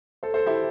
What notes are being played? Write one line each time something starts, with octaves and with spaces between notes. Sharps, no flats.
A4 C5
A4 C5
E4 G4